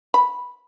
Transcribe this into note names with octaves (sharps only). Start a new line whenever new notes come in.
B5